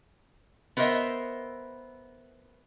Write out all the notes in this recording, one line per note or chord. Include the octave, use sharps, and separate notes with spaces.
B3 A#4 C5 C#5 D#5 E5